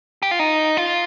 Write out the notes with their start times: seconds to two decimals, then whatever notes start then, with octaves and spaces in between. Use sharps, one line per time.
0.23 G4
0.31 F4
0.39 D#4
0.77 F4